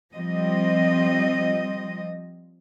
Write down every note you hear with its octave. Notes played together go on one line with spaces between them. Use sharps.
F3 G3 C4 D#5